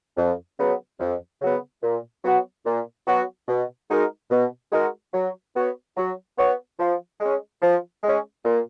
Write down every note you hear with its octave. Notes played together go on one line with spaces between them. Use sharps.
F2
C#3 F#3 B3
F2
C#3 F#3 B3
A#2
F#3 B3 F#4
A#2
F#3 B3 F#4
B2
G#3 D#4 F#4 A#4
B2
G#3 D#4 F#4 A#4
F#3
B3 F#4 C#5
F#3
B3 F#4 C#5
F3
G#3 C#4
F3
G#3 C#4
A#2